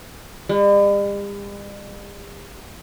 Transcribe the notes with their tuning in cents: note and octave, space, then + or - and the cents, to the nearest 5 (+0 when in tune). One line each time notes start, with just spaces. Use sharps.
G3 +45